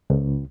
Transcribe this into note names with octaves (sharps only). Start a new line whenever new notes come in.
C#2